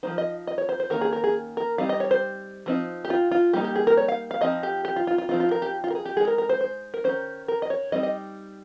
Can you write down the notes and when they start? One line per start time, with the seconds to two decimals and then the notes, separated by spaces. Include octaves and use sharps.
0.03 F3 G#3 D#4 C5
0.18 D#5
0.47 D#5
0.58 C#5
0.69 C5
0.80 C5
0.90 D#3 A#3 C#4 A#4
1.01 G#4
1.13 A#4
1.24 G#4
1.57 A#4
1.78 G3 C4 D#4 F5
1.89 D#5
2.00 C#5
2.11 C5
2.66 F3 C4 D#4
3.05 G4
3.10 F4
3.31 F4
3.53 G3 A#3 D#4 G4
3.64 G4
3.75 G#4
3.87 A#4
3.97 C#5
4.08 F5
4.31 F5
4.41 F3 C4 D#4 D#5
4.63 G4
4.85 G4
4.96 F4
5.07 F4
5.18 F4
5.29 F3 C4 D#4 F4
5.40 F4
5.51 A#4
5.62 G4
5.84 F4
5.90 A#4
5.95 G#4
6.06 G4
6.17 G#3 D#4 G#4
6.27 A#4
6.38 A#4
6.49 C5
6.61 C5
6.94 A#4
7.04 D#3 G#3 C#4 C5
7.48 A#4
7.62 D#5
7.70 C#5
7.92 G3 C4 D#4 D#5
8.03 D#5